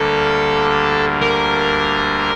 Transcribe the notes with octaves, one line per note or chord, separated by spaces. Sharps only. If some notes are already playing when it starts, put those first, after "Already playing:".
Already playing: D2 D3 G3 A#3 D4 A4
A#4